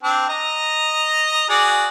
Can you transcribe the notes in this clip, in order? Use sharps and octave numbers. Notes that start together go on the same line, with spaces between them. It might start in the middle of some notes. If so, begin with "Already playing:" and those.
C4 D4
D#5 A#5
F#4 G#4 D5